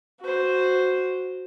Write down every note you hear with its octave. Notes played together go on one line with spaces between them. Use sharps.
F#4 C5